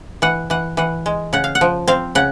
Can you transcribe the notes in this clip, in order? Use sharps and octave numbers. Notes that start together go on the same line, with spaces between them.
E3 F#5
E3 F#5
E3 F#5
G#3
C#3 F#5
F5
F#5
F3
C4 F5
C#3 F#5